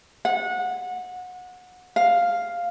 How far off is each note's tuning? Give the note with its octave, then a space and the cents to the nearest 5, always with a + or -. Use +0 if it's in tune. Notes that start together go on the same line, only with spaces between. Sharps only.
F#5 -25
F5 +0